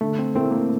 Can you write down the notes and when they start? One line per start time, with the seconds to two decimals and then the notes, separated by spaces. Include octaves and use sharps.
0.01 D3 A3
0.19 C4
0.35 A3 C4 E4 A#4
0.51 A#3